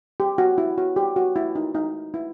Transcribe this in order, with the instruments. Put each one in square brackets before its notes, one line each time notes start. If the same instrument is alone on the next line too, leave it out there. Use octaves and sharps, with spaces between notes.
[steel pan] G4
F#4
E4
F#4
G4
F#4
E4
D#4
D#4
E4